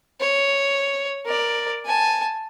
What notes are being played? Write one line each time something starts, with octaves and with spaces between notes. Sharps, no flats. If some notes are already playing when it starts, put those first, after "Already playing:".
C#5
A#4 D5
G#5 A5